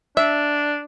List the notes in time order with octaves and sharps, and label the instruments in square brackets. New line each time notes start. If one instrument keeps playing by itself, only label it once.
[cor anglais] D4 [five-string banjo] E5